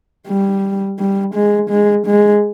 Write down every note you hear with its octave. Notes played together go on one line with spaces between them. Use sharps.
G3
G3
G#3
G#3
G#3